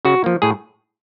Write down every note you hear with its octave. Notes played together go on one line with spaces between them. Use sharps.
C#3 F#4
F3 A#3
A2 G#4